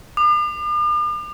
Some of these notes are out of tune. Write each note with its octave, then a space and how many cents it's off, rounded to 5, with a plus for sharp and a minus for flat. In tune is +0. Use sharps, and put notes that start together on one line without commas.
D6 +45